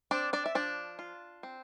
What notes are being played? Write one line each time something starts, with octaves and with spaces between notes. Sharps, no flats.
C4 D4 D5
D4 D5
E5
F3 D4 D5
F4
C4